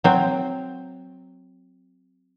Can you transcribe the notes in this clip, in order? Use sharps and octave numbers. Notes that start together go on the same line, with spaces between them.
F#3 C4